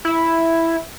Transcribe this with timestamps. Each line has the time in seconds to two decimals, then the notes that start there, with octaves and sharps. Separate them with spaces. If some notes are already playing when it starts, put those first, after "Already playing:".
0.05 E4